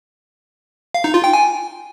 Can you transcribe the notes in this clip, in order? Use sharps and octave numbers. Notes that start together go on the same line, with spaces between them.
F5
D#4
F4
G5
G#5